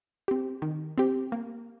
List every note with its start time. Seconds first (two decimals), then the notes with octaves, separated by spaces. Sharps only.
0.28 C4 G4
0.62 D#3
0.98 C4 G4
1.32 A#3